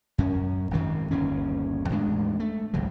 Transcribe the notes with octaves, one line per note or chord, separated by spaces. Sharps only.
F#2 C#4
G#1 F#2 C3 D#3
G1 D#2 C#3 C#4
E2 A2 G#3 D4
A3
G#1 C#2 C#3 F#3